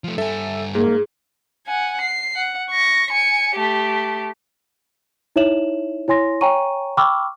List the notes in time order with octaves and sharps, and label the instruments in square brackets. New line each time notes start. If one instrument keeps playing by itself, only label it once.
[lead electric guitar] F3 A3
[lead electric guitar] G2 G#5 [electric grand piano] A4 E5
[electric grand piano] G#2 [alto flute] A#3 [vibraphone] G#4
[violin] F#5 G#5
C7
F#5
C#6 A#6
G#5 C#7
A3 G4
[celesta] D#4 E4 C#5 E5 E7 F#7
E4 C#5 G#5 C6 A#6
C#5 G5 G#5 A#5 C#6 D#7
G5 B5 C#6 D6 E6 F6